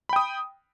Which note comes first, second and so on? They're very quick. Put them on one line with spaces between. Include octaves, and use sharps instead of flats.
B5 G5 D#6